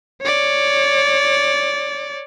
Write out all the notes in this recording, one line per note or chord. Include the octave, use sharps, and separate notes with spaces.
C#5 D5